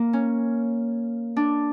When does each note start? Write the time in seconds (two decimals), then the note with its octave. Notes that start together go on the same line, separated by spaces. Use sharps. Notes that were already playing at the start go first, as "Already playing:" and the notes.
Already playing: A#3
0.13 C#4
1.37 D4